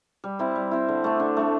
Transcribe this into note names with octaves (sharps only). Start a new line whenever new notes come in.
G3
C4 E4
G3
C4 E4
D3
A3 D4
D3
A3 D4